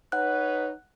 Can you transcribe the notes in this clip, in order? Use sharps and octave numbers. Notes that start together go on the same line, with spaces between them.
D#4 B4 C#5 F#5 F#6